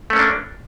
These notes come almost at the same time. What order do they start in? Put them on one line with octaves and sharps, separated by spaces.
A3 C#4 A#3 D4